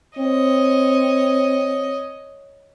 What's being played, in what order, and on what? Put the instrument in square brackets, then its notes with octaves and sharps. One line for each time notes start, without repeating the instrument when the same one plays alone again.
[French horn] C4 [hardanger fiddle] C#5 D#5